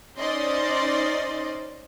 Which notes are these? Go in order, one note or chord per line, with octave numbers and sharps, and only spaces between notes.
C#4 D#4 C5 D5 D#5 C6